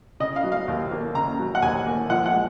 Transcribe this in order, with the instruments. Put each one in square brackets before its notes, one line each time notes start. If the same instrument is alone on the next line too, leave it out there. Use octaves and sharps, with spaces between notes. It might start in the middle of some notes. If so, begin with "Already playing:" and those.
[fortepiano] C#3 D#5
F5
F#3
F5
D#2
A#3
C#3 A#5
F#3
F#5
D#2 G#5
A#3
F3 F#5
F#5
G#3